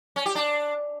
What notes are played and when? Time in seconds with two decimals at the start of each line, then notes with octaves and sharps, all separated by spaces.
0.16 C#4
0.26 G4
0.35 D4